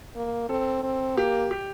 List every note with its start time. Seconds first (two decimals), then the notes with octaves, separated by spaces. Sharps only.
0.16 A#3
0.49 C4 A4
0.83 C4
1.17 A#3 G4
1.51 G4